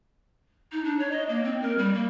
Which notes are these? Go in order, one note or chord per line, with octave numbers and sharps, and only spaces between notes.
D#4
D4
C#5
D#5
A#3
C4
A#4
G3
A#3